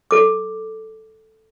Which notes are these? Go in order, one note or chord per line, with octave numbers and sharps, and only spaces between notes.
A4 D6